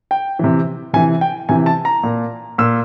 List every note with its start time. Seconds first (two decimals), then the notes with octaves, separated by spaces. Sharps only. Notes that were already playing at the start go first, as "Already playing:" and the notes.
0.11 G5
0.39 C3 E3
0.93 C3 E3 G#5
1.21 G5
1.49 C3 E3 G#5
1.66 A5
1.85 A#5
2.03 A#2
2.58 A#2 E6